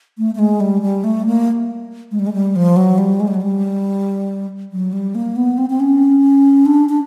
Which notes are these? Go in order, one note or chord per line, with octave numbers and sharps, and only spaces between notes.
A3
A3
G#3
G3
G3
A3
A#3
G#3
G3
G#3
G3
F3
F#3
G3
G#3
G3
F#3
G3
F#3
G3
A#3
B3
C4
C4
C#4
D4
D4